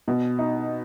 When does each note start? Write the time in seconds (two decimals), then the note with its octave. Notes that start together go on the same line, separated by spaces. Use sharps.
0.08 B2
0.39 D#4